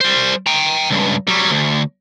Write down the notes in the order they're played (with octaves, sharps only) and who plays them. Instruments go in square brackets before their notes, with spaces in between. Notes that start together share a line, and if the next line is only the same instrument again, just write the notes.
[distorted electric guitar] G3 C5
G5 A#5
C#2 G2
F#3 G3
D2